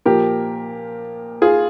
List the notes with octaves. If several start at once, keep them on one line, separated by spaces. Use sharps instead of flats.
A#2 F3 G4 A#4
F4 G#4